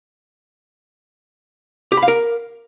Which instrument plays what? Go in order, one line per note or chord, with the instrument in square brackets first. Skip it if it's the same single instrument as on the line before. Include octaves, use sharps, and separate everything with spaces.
[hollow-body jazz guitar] G4
B5
F5
A#4